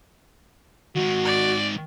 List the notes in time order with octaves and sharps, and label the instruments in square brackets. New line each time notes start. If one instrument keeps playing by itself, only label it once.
[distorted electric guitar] D#3 G#3 [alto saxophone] F#4
[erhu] D5